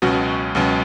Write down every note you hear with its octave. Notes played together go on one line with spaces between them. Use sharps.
C#2 B2 F#3 C#4 F#4
C#2 B2 F#3 C#4